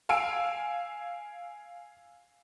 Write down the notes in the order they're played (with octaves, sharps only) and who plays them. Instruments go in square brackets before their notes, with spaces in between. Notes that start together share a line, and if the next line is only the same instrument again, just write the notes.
[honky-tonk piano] F5 G#5 E6 D7